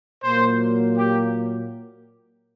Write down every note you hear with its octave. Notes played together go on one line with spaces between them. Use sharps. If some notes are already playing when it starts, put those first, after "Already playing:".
A#2 F#3 A#3 C5
G4